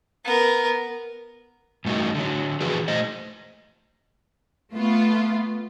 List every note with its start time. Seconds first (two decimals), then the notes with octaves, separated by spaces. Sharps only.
0.25 B3 A#4
1.85 G2 A3 D#4 F#4
2.15 D3 F#3
2.60 E3 F3 A3 F#4 G#4 B4
2.88 A3 C5 D#5
4.74 A3 B3 F4